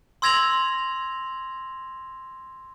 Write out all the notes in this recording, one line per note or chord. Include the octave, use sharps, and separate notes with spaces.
C6 E6 G#6 A#6 F7 F#7